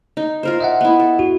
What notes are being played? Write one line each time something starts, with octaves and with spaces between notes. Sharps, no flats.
D#4
F4 A#4 C5
D#5 E5 F#5
B3 E4
A4
F#4